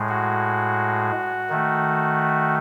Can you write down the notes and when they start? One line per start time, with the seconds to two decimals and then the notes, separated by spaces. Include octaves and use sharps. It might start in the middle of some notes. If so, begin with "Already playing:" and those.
Already playing: A2 G#3
0.09 F#4
1.50 D#3 A3